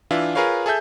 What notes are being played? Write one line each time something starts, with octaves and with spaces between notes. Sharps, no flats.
E3 D4 F4 E5
F4 G#4 A#4 B4 C#5 F5
G#4 A4 E5 G6